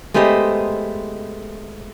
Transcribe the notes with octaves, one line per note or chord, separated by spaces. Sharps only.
G#3 A3 B3 G4 C5 D#5